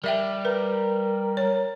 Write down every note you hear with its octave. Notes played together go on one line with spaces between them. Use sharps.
G3 A#4 E5 G5
A#4 B4
C#5